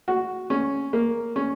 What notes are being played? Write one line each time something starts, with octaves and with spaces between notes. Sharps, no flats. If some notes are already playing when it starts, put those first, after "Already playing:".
F#4
C#4
A#3
C#4